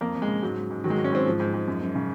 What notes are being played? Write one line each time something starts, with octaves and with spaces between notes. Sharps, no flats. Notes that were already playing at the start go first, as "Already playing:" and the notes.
F2 A#3
F2
G#3
C#3
G#2 F#3
G#2
G#2
D#3 F#3
G#3
F#3
G#2
C#4
G#2 C4
G#2 F3
G#2
G#2
F#2
F#2
C#3